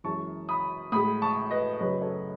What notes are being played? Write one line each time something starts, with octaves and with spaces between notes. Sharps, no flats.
F#2 E3 G#3 A5 C#6
B5 D#6
A2 G#3 B5 D#6
A5 C#6
B4 D#5
F#2 C#3 F#3 B4 D#5
A4 C#5